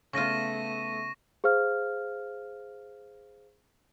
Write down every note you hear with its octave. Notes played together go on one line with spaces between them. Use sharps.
C#3 A3 B3 F4 C#6 A#6 D#7
G#4 C5 F5 F6